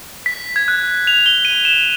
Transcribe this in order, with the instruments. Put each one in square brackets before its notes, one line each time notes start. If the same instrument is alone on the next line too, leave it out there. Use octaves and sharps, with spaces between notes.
[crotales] B6
G#6
F#6
F7
G7
D#7
E7